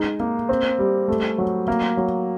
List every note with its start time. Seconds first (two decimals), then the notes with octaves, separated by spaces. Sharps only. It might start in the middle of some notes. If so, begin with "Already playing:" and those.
Already playing: G#3 D#4
0.20 A#3
0.49 C4
0.79 G3
1.08 A3
1.38 F#3
1.68 A#3
1.97 F#3